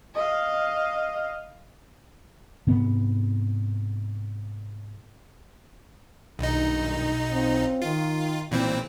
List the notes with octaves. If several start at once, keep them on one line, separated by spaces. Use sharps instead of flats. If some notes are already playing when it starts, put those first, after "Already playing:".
D#5 F5
G#2 C3 B3
B1 G2 A#2 D#3 D#4
C4 C#4 F4
D#3 F4
B1 F#2 A#2 E3 G3 C4